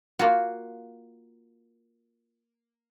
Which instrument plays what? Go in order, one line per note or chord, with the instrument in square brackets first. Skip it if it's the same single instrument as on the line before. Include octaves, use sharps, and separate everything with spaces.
[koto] A#3 F4 F#4